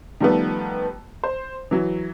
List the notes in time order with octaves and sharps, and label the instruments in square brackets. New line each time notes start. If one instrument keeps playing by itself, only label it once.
[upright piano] D#3 F3 G3 A3 B3
C5
E3 F#3